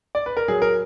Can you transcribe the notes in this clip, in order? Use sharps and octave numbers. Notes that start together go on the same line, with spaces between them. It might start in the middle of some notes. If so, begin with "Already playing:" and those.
D5
B4
A#4
F#3 G#4
A#4